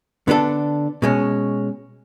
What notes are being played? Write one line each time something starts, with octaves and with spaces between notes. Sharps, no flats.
D3 B3 D4 A4
B2 G#3 C#4